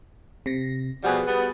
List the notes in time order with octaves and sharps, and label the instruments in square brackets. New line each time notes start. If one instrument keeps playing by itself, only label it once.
[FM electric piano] C3 A#6
[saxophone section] B2 F3 G3 [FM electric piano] F#4 G#4 B4
[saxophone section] G3 B3